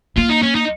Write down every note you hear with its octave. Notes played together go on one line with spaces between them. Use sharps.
A#3 F4
D#4
C#4
D#4